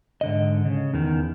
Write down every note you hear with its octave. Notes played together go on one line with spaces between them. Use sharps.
G#2 D3 D#5
C#3
E2 D#3